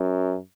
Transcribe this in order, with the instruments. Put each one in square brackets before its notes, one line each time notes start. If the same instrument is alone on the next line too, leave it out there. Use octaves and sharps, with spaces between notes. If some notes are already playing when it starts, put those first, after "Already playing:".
Already playing: [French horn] F#2